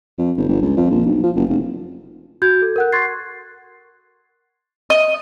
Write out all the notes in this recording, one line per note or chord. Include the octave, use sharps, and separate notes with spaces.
F2
G1
G1
C#2
F2
A#1
B1
F3
F#1
F1
F#4 G6 G#6
A4
A#4 F#5 F#6
C6 C#6 F#6 G#6 A6 C7
D#5